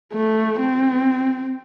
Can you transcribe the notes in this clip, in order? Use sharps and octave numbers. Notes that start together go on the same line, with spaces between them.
A3
C4